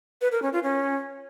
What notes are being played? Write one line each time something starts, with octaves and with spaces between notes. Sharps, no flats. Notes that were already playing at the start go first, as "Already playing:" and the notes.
B4
A#4
C#4
F4
C#4